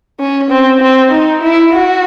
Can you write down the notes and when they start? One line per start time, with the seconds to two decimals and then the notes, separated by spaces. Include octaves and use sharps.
0.19 C#4
0.51 C4
0.80 C4
1.11 D#4
1.42 E4
1.72 F#4